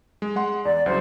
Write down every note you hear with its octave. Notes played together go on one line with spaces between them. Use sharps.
G#3
G#3 F#5 C6
E2 D5
C2 C#3 F#3 C5